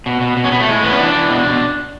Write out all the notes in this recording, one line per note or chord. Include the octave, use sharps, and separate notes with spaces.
B2
B2
B2
C#4
B2 B3
A3
A2 G#3
E3 B3
C#4
E3 D4
E3
B2
B2